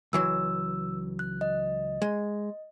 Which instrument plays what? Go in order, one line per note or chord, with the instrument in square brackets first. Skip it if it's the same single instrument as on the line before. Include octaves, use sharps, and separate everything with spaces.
[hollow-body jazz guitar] C#2 E3 F#3 [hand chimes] E6
[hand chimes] F#6
D#5
[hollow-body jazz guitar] G#3